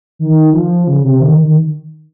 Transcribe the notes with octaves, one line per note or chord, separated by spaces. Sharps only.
D#3
F3
C#3
C3
D#3
D#3